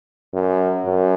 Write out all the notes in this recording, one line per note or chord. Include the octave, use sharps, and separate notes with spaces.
F#2
F#2